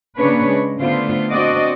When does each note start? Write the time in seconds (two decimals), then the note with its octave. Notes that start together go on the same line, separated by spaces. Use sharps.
0.17 C#3 A#3 D4 B4 C#5
0.49 G#3
0.80 D3 A3 B3 F4 C5
1.31 C4 D4 F#4 D5 D#5